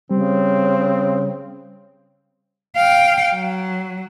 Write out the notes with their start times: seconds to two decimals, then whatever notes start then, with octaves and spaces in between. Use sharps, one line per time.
0.11 C#3 G3 C4
2.76 F5 G5
3.34 F#3